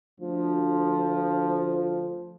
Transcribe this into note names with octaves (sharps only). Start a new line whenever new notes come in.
D2 F3